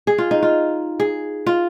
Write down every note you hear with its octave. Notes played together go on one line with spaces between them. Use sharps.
G#4
F4
D#4
F4
G#4
F4